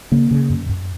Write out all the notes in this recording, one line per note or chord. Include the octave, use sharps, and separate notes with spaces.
C#3 A#3
C#3
F#2
F#2